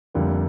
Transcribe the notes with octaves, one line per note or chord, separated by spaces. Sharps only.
F1 F2 D3 G3 A#3